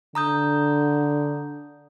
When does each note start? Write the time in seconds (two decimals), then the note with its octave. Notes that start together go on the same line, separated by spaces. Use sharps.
0.15 D3 A#5 D#6 G6